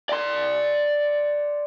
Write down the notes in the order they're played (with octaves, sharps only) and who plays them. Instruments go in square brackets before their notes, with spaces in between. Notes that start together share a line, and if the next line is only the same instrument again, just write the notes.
[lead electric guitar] D5 C6